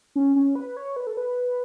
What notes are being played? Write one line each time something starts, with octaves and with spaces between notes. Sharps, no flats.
C#4
C#4
B4
C#5
B4
A4
B4